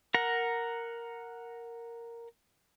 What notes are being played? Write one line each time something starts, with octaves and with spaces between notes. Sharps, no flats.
A#4 F#5 A#5